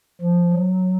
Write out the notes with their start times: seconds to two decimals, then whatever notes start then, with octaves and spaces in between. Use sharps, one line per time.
0.21 F3
0.53 F#3